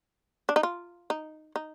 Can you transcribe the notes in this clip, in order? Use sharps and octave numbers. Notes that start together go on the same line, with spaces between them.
D4
D#4
F4
D#4
D#4